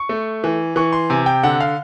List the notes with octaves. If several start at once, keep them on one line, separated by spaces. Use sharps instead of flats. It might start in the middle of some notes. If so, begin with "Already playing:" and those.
Already playing: C#6
A3
E3
E3 C#6
C6
C3 G#5
G5
D3 F#5
F5